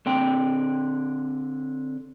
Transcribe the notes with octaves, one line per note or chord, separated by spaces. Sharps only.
D3 C4 G5